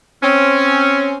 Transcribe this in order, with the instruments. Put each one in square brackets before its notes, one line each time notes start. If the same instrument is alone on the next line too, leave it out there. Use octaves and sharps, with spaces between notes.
[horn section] C4 C#4